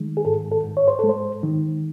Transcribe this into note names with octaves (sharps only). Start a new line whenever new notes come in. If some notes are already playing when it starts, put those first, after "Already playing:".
Already playing: D#3 G#3
G#4
G#2 A4
A4
G#2
C#5
C5
G#3 A4
C5
D#3